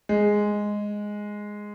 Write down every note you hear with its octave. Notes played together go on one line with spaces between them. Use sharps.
G#3